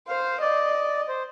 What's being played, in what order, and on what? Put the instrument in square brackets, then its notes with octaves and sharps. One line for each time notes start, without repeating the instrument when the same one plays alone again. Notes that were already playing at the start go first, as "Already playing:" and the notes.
[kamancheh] C5 [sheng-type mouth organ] F5
[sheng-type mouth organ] D5 [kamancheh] D#5
[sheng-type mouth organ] C5